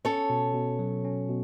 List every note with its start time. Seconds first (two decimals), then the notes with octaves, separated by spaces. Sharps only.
0.05 C#4 A4 C#5
0.30 B2
0.54 B2
0.79 F#3
1.05 C#4
1.29 B2